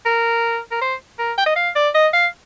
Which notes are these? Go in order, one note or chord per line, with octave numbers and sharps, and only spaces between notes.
A#4
A#4
C5
A#4
G5
D#5
F5
D5
D#5
F5